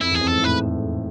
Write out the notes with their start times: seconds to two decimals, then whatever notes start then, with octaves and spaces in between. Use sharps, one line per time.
0.01 F2 E4
0.11 E2 G#4
0.21 F2
0.28 G#2 A4
0.43 A2 B4